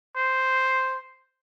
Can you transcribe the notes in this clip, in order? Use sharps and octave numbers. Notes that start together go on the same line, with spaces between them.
C5